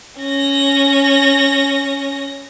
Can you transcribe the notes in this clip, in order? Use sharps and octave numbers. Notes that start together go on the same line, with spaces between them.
C#4 A#6